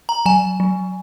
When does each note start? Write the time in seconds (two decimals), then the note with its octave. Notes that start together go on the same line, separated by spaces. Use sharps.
0.09 A#5
0.26 F#3 G#5
0.60 F#3